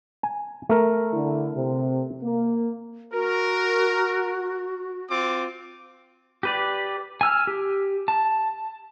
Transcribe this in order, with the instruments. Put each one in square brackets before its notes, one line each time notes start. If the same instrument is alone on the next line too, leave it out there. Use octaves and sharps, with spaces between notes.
[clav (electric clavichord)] G#5
A3 A#4
[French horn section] D3 E4
C3
A#3
[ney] F#4 [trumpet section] A#4
[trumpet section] C4 F4 D6
[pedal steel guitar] G4 B4 D5
G#5 E6 F6
G4
A5